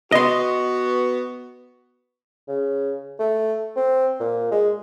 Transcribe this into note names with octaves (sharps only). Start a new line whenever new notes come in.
B3 F#4 D#5 C6
C#3
A3
C4
A#2
G#3